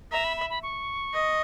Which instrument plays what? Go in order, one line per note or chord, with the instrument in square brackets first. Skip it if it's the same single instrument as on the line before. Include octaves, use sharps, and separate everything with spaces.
[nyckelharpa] E5 [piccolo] A#5
[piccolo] B5
B5
B5
C#6
[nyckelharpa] D#5